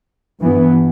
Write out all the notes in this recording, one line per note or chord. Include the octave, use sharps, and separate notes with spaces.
G2 E3 B3